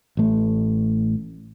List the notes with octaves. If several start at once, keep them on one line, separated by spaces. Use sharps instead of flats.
A1 A3